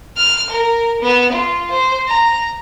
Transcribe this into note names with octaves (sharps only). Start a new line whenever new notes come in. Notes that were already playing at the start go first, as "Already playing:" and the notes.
F6
A#4
B3
F4
C5
A#5